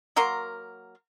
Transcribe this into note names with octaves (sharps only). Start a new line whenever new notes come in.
F#3 A#3 A#4 C6